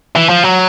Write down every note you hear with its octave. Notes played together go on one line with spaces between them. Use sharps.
E3
F3
F#3